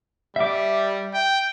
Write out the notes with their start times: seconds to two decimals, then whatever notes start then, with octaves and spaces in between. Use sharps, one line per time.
0.36 G3 E5 D6
1.14 G5